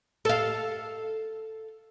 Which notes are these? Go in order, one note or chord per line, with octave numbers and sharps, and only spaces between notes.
A4 F5